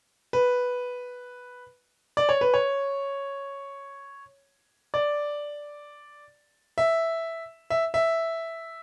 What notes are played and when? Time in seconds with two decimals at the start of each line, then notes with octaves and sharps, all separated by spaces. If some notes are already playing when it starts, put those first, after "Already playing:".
0.33 B4
2.17 D5
2.29 C#5
2.41 B4
2.54 C#5
4.94 D5
6.78 E5
7.70 E5
7.94 E5